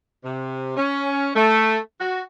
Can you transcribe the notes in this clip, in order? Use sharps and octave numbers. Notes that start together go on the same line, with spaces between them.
C3
C#4
A3
F#4